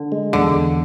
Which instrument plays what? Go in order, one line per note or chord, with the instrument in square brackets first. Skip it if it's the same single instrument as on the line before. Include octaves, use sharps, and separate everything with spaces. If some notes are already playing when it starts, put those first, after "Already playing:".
Already playing: [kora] D3
[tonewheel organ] G#3
[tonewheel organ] E2 [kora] D3
[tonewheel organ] E2